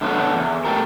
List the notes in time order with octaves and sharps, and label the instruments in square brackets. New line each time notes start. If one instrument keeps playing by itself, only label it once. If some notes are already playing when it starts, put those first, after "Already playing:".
[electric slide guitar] D3 A3 B3 C#4 A4
E2
A3 G4 A4 A#4